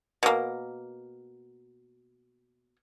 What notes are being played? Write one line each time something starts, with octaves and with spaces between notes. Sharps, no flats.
B2 A#3